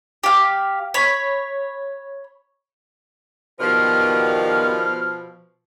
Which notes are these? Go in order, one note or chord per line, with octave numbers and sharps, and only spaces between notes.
G4 F5
C#5 B5
B2 D#3 F3 B3 G4 D5 F6